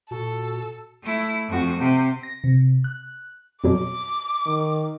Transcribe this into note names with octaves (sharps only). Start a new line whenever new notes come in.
A#2 F#4 A4
A3 E4
F2 F#4
C3
A#6
C3
F#6
F2 B2 F#3 D6
D#3